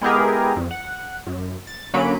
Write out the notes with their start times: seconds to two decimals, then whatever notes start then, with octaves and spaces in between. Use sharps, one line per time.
0.01 G#3 B3 E4 G4 G#4 A#4
0.56 F2
0.71 F#5
1.27 F#2
1.67 A6
1.94 D3 F#3 A#3 C#4 B5 D7